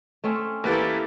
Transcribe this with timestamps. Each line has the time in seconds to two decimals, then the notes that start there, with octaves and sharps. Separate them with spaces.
0.24 A3 C4 C#4
0.64 E2 A#3 E4 G4 A4 B4 A6